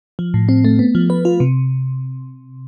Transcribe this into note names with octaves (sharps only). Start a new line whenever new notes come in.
F3
A2
C4
A3
B3
F3
B4
F4
C3